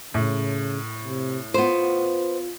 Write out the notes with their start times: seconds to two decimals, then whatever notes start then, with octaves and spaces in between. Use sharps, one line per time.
0.14 A2 C#3
1.04 C3
1.54 B3 F4 C5